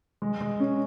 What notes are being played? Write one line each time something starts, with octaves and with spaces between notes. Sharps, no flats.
G#3
G#3
C#4